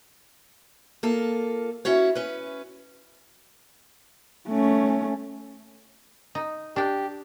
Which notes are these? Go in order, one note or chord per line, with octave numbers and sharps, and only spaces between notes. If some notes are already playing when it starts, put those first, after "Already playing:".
A#3 F4 A4
C#4 E4 F#4 C#5
C#4 B4
A3 C#4
D#4
D4 G4 G5